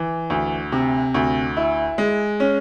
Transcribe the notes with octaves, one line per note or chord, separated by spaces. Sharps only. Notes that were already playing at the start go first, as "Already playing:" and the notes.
Already playing: E3
D2
C3
D2
E4
G#3
C#4